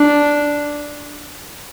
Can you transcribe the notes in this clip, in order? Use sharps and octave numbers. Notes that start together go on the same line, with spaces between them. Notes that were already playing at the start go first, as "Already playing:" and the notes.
Already playing: D4